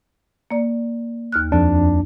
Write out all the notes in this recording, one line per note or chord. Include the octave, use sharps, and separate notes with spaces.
A#3 D5
D#2 F6 F#6
F2 D4